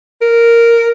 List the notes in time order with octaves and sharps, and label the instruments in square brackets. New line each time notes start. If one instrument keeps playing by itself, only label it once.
[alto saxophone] A#4